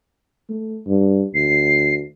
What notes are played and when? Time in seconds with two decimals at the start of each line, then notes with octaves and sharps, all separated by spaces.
0.49 A3
0.86 G2
1.35 D2 C7